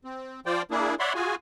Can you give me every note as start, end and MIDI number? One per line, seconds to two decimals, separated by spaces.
0.04 0.40 60
0.46 0.62 53
0.46 0.62 65
0.46 0.62 72
0.46 0.62 74
0.46 0.62 79
0.71 0.95 58
0.71 0.95 62
0.71 0.95 64
0.71 0.95 68
0.99 1.13 73
0.99 1.13 74
0.99 1.13 76
0.99 1.13 78
0.99 1.13 83
0.99 1.13 84
1.15 1.35 65
1.15 1.35 66
1.15 1.35 68
1.15 1.35 80